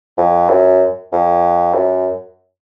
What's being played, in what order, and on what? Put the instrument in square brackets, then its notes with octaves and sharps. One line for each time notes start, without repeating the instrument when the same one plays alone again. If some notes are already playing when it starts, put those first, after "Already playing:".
[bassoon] F2
F#2
F2
F#2